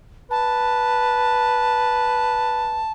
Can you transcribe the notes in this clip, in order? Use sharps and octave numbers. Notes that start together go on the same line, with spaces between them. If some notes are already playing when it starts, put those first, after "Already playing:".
B4 A5